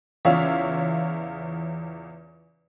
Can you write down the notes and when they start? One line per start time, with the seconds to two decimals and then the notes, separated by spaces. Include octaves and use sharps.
0.25 E2 C#3 F4 C#5 E5 F5